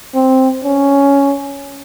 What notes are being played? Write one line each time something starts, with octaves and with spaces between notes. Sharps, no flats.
C4
C#4